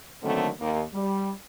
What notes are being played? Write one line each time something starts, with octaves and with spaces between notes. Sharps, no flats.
D3 D#3 F#3 A3 A#3 C4
D#2 A#3
G3